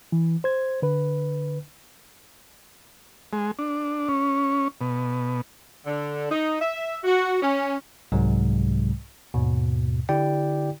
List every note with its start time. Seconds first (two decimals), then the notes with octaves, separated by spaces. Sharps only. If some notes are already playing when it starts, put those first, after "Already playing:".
0.12 E3
0.44 C5 G#6
0.82 D3 B4
3.33 G#3
3.59 D4
4.09 C#4
4.81 B2
5.86 D3
6.31 D#4
6.61 E5
7.04 F#4
7.43 C#4
8.12 C2 G#2 C3 F#3 G#3
9.34 D#2 G#2 B2
10.09 D3 E4 G4 D5 G5